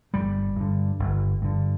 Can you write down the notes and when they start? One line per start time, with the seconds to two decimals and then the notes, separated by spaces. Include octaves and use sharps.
0.13 G1 G3
0.57 G2 D3
0.99 G1
1.42 G2 D3